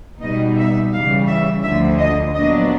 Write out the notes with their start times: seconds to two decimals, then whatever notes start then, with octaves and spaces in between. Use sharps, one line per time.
0.22 B2 G3 B3 D#4 D#5
0.58 E5
0.93 C#3 E3 G3 F5
1.28 E5
1.64 D2 D3 F3 E5
1.99 D#5
2.34 A#2 F#3 B3 D4 D#5